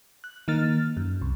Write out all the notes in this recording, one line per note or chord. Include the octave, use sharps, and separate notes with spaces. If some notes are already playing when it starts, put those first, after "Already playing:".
F#6
D#3 A#3 F6 A6
F#2
C2